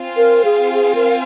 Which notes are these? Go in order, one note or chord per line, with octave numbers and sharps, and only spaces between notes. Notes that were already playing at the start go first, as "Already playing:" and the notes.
Already playing: C4 F4 C5 F5 G#5
A#4
G#4
G#4
A#4